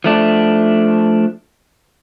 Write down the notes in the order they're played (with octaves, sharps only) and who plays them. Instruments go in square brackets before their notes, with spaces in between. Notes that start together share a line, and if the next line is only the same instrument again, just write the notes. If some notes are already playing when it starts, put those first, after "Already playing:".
[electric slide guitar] F3 A3 D4